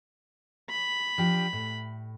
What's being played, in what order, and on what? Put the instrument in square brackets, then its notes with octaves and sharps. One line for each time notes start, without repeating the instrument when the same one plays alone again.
[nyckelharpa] B5
[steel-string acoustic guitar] F3 D4 G4
A2